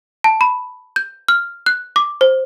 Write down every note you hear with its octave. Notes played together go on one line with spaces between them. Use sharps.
A5
B5
G6
F6
F#6
D6
C5